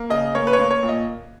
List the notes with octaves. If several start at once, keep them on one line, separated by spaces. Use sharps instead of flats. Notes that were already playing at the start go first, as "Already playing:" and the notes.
Already playing: A#3
C#3 D#5
A#3 C#5
B4
C#5
A#3
C#5
A#2
D#5